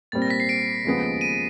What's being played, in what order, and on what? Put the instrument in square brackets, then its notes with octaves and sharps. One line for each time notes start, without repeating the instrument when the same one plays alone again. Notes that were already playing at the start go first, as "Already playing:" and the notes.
[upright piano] A#2 G3 C4 [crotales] A6
[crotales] A#6
B6
C7
D7
[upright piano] D#2 C#3 F3 G#3 B3
[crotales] D#7